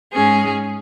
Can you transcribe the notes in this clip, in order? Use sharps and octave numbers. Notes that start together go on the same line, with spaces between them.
G#2 G#3 C#4 G#4